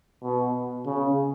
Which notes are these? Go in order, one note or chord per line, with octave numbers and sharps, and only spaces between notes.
B2
C#3